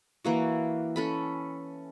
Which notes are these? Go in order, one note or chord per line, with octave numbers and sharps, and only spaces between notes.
E3 A#3 F#4
C#4 A4 B5